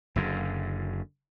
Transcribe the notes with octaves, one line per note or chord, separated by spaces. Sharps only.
F#1 F#2 D3